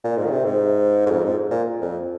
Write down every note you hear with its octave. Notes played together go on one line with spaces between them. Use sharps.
A#2
G#2
D#3
C3
G#2
G#2
F2
G#2
A#2
F2